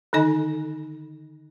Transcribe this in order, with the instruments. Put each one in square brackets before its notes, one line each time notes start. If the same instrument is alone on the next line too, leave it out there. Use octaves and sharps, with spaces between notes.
[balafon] D3 D#3 D#4 D#5 G#5